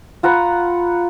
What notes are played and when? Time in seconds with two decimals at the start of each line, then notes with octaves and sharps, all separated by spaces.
0.23 F4 F#5 A#5 B5